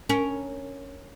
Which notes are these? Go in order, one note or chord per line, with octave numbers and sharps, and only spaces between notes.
C#4 A#4